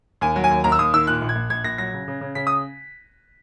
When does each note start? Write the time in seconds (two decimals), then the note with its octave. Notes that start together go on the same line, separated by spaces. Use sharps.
0.21 D#2 G#5
0.36 F#3
0.44 G#5
0.51 D#2
0.64 D#2 A#5
0.72 E6
0.79 D#2 D#6
0.94 D#3 E6
1.07 A#2 F#6
1.21 A#1
1.29 G#6
1.35 A#1
1.50 A#1 G#6
1.64 A#1 A#6
1.78 F#3 A#6
1.93 C#3
2.08 C#3
2.21 C#3
2.35 C#3 B6
2.47 D#6